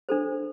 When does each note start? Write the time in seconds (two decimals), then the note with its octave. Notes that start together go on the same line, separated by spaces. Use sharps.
0.09 D4 A4 C5